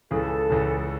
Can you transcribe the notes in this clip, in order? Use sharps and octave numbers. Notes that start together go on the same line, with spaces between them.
C#2 C#3 E3 A4
C#2 C#3 E3